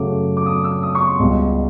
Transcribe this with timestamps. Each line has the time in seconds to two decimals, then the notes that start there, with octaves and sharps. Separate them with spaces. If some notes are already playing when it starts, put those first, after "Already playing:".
Already playing: F#2 C#3 F#3 A3 D6
0.37 D6
0.46 D#6
0.64 E6
0.83 D#6
0.95 C#6
1.07 C6
1.19 C#2 B2 G3